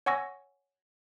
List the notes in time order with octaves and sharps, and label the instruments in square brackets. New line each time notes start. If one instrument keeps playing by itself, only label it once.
[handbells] C#5 F#5 G#5 C#6 E6 A#6